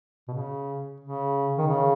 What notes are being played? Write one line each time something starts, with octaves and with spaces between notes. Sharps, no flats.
B2
C#3
C#3
D#3
C#3